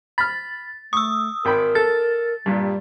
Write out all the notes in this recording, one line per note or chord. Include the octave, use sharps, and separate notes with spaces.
B5 F6 A6
A3 C#6 D#6 E6
G#1 A#4 G5 B5
A4 A6
G2 A#2 G3